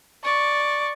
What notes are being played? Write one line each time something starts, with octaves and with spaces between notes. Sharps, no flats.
D5 C#6